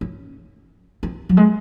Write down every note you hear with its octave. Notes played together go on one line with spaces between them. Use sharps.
C#4
C4
F#3
G#3